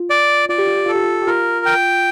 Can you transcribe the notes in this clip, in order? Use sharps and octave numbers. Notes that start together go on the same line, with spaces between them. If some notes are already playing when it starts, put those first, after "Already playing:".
Already playing: F4
D5
F4 D5
G4
F4
G4
F4 A4
G4
F4
G4
F4 A#4
G5